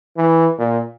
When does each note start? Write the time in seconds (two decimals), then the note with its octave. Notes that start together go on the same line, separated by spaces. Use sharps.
0.16 E3
0.59 A#2